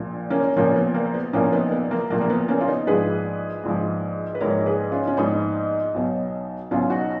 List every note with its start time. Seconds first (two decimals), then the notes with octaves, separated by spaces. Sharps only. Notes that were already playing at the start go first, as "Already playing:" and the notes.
Already playing: A#1 A#2 F3
0.30 A#3 C#4
0.56 A#1 A#2 F3 A#3 C#4
0.76 B3
0.94 A#3
1.14 B3
1.33 A#1 A#2 F3 A#3 C#4
1.52 B3 D#4
1.72 B3
1.91 A#3
2.10 A#1 A#2 F3 A#3
2.21 A#3
2.30 B3
2.48 A#3 C#4
2.60 F4
2.68 B3 D#4
2.87 A#1 G#2 F3 G#4 B4
3.64 A#1 G#2 F3
4.35 B4
4.40 A#1 G#2 F3 A#4 C#5
4.66 G#4 B4
4.92 C#4 F4
5.07 C#4
5.17 A#1 G#2 F3 B3 D#4
5.94 B1 B2 F#3
6.71 B1 B2 F#3 C#4 F4
6.90 D#4 F#4